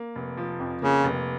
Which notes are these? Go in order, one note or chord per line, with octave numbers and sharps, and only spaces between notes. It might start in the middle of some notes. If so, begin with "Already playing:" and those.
Already playing: A#3
F1
F3
F2
C#3 A#3
F1